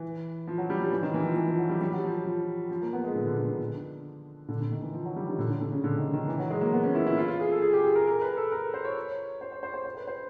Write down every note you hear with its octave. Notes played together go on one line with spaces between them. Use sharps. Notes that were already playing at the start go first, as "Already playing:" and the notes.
Already playing: E3
F3
F#3
G3
F3
E3
D#3
E3
F3
E3
F3
F#3
G3
G3
F#3
F3
F3
F3
A#3
B3
G#3
D3
D3
D3
D#3
D3
D3
D3
D#3
E3
F3
F#3
G3
D#3
D3
D3
D3
C#3
D3
D#3
D#3
E3
F#3
G#3
A#3
B3
C#4
E4
E4
F4
F4
G#4
A4
G#4
G4
G#4
A#4
A#4
B4
A4
A#4
C5
C#5
C5
C5
C5
C5
C5
B4
C5